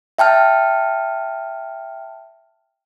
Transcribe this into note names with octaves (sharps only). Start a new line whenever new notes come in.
E5 G5 A5 F6